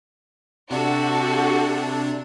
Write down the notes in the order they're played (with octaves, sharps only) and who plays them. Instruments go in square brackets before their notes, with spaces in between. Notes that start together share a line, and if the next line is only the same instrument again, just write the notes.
[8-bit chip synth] C3 D4 [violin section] F#4 [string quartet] G4 A4 A5